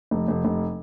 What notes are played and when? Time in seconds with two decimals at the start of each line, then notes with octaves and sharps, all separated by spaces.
0.11 F1
0.28 F1
0.45 F1